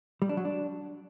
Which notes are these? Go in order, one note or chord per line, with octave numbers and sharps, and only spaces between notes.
G3
D4
F#3
D4